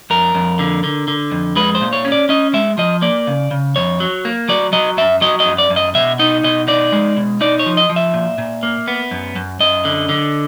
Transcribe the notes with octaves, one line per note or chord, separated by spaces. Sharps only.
F2 A#4
F2
D3
D3
D3
F2
G#3 B4
C5
A#2
C#5
C#4
D5
C#4 D#5
G#3 E5
F3 D#5
A#3 D5
C#3
C#3
F2 C#5
F#3
A#3
F#3 D5
F#3 D#5
F#2 E5
F#3 D#5
D#5
F#2
D5
F#2
D#5
B2 E5
D#4 D#5
B2 D#5
D#4 D5
G#3
B2
D#4 D5
C#5
F3
D#5
F3
E5
A#2
A#2
A#3
B3
F#2
F#2
F#2 D#5
D3
D3